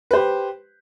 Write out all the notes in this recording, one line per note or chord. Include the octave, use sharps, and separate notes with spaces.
G4 B4 C5